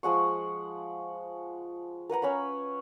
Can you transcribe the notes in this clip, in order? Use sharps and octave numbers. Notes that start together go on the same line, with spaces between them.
F3 G#3 F#5 C#6
A#4 B4 F#5 A#5
C#4 C#5 F#5 B5